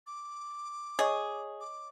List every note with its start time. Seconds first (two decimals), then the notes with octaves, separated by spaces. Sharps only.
0.07 D6
0.99 G#4 C#5 D#5 C#6
1.60 D6